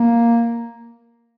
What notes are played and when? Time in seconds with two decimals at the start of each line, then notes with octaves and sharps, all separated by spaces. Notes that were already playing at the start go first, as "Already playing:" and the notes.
Already playing: A#3